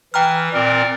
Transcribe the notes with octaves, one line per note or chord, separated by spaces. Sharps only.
E3 G5 A#5 F6
A#2 C4 A#4 D5